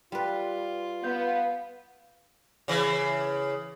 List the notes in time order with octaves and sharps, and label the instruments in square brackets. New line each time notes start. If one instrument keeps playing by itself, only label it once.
[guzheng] G3 B4 [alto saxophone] F4
[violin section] B3 [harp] F5 G6
[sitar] C#3 E3